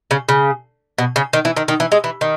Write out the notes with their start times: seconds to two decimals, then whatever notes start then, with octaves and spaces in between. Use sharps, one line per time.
0.11 C#3
0.29 C#3
0.98 B2
1.16 C#3
1.33 D#3
1.45 E3
1.57 D#3
1.68 D#3
1.80 E3
1.92 G#3
2.04 E3
2.21 D#3